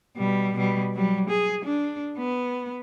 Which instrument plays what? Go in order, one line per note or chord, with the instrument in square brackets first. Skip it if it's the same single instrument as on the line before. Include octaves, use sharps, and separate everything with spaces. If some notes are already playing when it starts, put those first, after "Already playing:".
[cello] B2 G3
B2 G3
F#3 G3
G#4
D4
B3